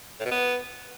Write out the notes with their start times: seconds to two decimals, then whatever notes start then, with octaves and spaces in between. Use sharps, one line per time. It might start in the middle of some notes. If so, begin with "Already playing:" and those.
0.20 A2
0.25 B2
0.31 B3